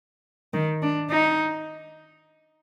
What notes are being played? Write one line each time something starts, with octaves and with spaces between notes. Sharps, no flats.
D#3
D4
D#4